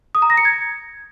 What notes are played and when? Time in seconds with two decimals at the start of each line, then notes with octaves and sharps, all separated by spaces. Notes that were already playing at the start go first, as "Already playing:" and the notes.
0.15 D#6
0.22 A#5
0.30 A#6
0.37 C#7
0.45 G#6